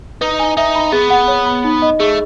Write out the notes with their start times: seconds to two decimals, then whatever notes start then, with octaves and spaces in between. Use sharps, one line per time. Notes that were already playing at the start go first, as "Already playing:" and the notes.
0.21 D#4 B4
0.39 G#5
0.57 D#4 E5
0.75 B5
0.92 B3 G#4
1.10 F#5
1.28 C#5
1.46 B5
1.64 D#4
1.82 D#5
2.00 A3 G#4